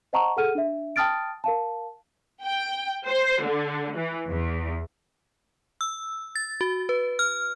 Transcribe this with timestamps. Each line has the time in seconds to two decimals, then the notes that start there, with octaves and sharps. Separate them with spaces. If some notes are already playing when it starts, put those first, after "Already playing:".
0.13 C5 D#5 F#5 A5 A#5 C#6
0.37 G#4 A4 F#5 F6 D#7
0.55 D4 E5
0.96 G5 A5 D#6 F6 A6 D7
1.44 A#4 F5 A5
2.43 G5
3.06 C5
3.45 D3
3.97 E3
4.28 E2
5.81 E6
6.35 A6
6.61 F#4
6.89 B4
7.19 F6